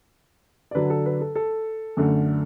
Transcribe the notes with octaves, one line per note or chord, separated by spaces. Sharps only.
D5
D3 F#3 D4 B4
A4
B4
A4
A4
F#2 D3 A3